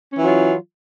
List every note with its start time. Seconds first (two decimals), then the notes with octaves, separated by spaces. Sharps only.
0.13 C#4
0.17 E3
0.22 F#3
0.26 F4